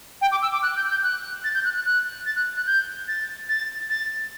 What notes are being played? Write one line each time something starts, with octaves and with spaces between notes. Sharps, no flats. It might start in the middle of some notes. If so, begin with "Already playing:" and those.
G5
D6
E6
D6
F#6
G6
G6
F#6
A6
G6
F#6
F#6
F#6
A6
F#6
F#6
G6
A6
A6
A6